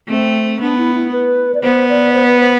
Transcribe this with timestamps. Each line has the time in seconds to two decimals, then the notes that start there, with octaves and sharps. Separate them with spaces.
0.09 A3 C4
0.60 B3 D4
0.78 E4
0.95 E4
1.12 B4
1.54 D5
1.62 B3 C5
1.89 D5
2.14 C5
2.28 B4
2.40 C5